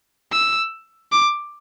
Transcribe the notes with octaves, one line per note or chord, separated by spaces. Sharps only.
E6
D6